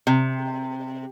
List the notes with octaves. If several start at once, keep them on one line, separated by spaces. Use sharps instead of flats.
C3